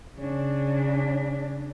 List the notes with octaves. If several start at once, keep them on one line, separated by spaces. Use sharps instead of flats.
C#3 D4